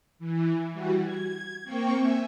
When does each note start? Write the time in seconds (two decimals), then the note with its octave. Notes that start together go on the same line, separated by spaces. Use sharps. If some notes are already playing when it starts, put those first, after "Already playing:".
0.19 E3
0.71 E3 G3 F#4
1.02 G#6
1.64 A#3 C4 G5 C#6
1.96 E5 G#5